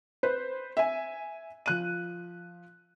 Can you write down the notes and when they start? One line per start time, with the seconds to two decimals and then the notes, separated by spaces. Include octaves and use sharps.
0.23 B4 C5
0.77 E5 G#5
1.66 F3 F#6 D#7